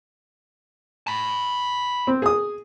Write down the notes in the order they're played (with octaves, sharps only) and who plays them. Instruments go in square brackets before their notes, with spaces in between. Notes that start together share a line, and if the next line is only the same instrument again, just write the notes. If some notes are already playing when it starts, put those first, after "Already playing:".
[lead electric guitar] A5 B5
[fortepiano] C4
G#4 D#6